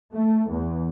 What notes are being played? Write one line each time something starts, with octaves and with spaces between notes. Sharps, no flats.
A3
E2